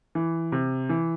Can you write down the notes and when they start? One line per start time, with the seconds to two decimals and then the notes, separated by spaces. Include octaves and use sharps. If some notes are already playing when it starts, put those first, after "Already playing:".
0.15 E3
0.52 C3
0.89 E3